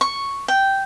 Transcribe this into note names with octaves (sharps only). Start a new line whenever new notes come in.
C#6
G5